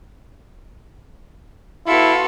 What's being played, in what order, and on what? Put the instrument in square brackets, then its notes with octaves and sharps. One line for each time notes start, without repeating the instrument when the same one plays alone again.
[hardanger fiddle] B3 A4 [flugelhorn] E4 [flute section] F#4 F5 C6